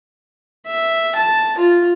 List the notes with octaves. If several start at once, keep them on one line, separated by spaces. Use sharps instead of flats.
E5
A5
F4